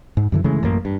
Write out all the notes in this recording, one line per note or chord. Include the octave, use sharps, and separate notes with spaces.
G#2
F#2 D3 E3
C#3 E3 G#3 A3
A1 F#2 A#3
G2